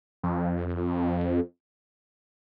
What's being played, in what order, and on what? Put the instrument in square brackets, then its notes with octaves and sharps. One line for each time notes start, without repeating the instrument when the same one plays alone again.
[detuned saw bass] F2